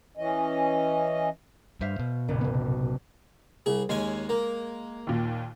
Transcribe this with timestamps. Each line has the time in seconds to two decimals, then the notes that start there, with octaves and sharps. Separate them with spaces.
0.17 E3 C#4 D#5
1.81 G2 C5 E5 F5
1.99 B2
2.28 F#1 B1 A#2
2.41 C3 B3
3.66 C2 G#4
3.89 D#2 G#3 C#4 G#5
4.29 A#3
5.07 D#2 A#2